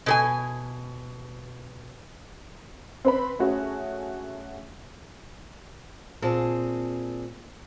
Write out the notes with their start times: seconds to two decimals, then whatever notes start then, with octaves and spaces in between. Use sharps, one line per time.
0.06 B2 A4 G#5
3.05 C4 B4 B5
3.39 A3 C#4 F#4 G#4
6.22 A#2 C4 G#4 A5